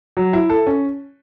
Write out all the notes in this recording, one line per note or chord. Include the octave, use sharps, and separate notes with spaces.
F#3
E4
A4
C#4